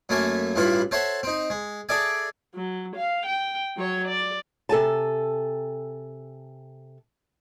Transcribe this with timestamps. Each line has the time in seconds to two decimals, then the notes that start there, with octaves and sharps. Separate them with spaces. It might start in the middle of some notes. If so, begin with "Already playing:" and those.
0.09 F#2 A3 A#3 E5 G#5
0.56 A1 G2 E3 E4 F4 B5
0.91 A4 C5 C#5 E5 F#5
1.23 C4 D#4
1.50 G#3
1.89 G#4 A4 D5 E5 G#5
2.55 F#3
2.96 F5
3.27 G5
3.77 F#3 C#5
4.08 D5
4.69 C3 A4 G#5 A5